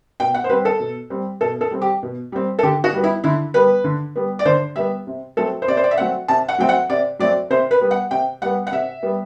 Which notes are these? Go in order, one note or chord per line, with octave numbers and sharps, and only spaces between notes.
B2 G5
F#5
C5
G3 C4 B4
A4
B2
G3 C4
B2 A4
A4
G3 C4
G4
B2
G3 C4
A4
D3 G4
F#4
G3 B3
E4
D3 E4
G3 B3 B4
D3
G3 B3
D5
D3 C5
G3 B3 E5
C3
F#3 A3 C4 A4
C5
C3 D5
C5
D5
E5
F#3 A3 C4 F#5
C3 A5
F#5
F#3 A3 C4 G5
F#5
C3 D5
F#3 A3 C4 D5
C3 C5
B4
G3 B3
F#5
C3 G5
G3 B3 F#5
F#5
C3 E5
G3 B3